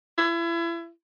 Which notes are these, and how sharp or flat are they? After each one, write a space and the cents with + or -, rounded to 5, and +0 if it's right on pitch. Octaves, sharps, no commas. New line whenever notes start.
E4 +35